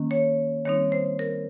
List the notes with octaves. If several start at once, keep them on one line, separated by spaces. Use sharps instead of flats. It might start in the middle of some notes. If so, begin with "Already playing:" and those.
Already playing: D#3 A#3 C#4
C#5
D#3 G3 C4 D#4 C#5
C5
A#4